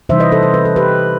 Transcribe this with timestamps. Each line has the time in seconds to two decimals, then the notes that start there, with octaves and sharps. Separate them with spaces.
0.09 C3 E3 G3 D#4 C5 E5
0.20 B4 D#5
0.32 A4 C5
0.43 C5
0.54 B4
0.65 A4
0.76 G4 B4